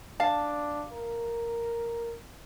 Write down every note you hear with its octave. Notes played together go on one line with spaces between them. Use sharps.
D4 F5 A5
A#4